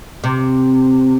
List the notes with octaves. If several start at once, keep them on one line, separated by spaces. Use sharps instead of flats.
C3